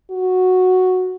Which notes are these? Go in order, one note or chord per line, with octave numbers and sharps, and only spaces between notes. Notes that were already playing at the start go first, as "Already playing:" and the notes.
F#4